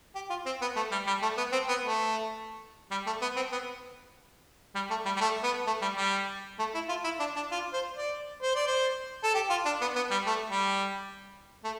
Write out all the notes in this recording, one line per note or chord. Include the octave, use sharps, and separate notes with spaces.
G4
F4
C4
B3
A3
G3
G3
A3
B3
C4
B3
A3
G3
A3
B3
C4
B3
G3
A3
G3
G3
A3
B3
A3
G3
G3
A3
E4
F4
E4
D4
D4
F4
C5
D5
C5
D5
C5
A4
G4
F4
D4
B3
B3
G3
A3
G3
A3